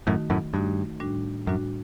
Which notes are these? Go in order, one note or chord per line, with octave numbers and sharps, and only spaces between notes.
F#2 A2 D#3 A3 D#4 F#4
F#2 A2
G2 D#3 A3 D#4 F#4
A2 G3 D4 F#4
F#2 A2 G3 D4 F#4